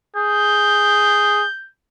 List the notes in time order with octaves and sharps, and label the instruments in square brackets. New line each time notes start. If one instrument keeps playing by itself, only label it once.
[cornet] G#4 [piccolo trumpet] G6